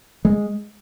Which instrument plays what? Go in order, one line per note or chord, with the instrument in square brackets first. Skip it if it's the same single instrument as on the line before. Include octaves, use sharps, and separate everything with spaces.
[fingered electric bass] G#3